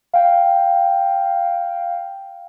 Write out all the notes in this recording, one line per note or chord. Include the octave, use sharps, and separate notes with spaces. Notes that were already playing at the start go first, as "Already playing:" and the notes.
F5 G5